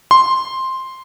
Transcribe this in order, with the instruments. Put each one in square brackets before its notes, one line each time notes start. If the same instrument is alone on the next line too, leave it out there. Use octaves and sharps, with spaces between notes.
[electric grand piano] C6